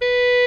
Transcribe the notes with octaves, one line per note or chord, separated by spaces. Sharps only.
B4